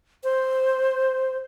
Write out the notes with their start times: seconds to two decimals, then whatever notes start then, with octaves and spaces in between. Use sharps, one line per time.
0.24 C5